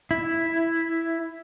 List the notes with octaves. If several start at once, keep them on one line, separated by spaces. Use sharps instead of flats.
E4